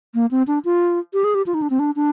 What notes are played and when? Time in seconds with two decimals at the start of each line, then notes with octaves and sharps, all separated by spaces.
0.15 A#3
0.31 C4
0.47 D4
0.65 F4
1.13 G4
1.24 G#4
1.35 G4
1.46 F4
1.54 D#4
1.62 D4
1.70 C4
1.79 D4
1.96 D4